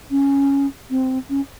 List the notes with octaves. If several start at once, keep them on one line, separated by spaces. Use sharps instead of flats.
C#4
C4
C#4